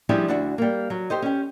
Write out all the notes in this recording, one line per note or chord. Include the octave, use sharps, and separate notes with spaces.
F3 G3 D4 E4 G4 G#4
D2 D4 E4 F#4
G3 A#3
F#3
G4 A4 C5 D#5
C#4 G4